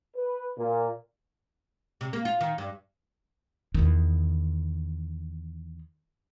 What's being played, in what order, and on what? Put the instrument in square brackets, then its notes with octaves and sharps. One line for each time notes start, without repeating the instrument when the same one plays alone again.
[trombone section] B4
A#2
[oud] C3
A#3
F4
D#3
G2
[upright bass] E2 D#3